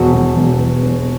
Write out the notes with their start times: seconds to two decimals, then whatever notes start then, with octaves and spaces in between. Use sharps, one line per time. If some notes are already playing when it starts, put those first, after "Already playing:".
Already playing: E1 F#4
0.13 E1
0.36 E1
0.59 E1
0.83 E1